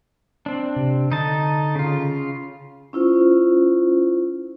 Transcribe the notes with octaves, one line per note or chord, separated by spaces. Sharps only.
C4 D4
C3
D3 D#4 A5
C#3 F4
C#4 E4 F4 C5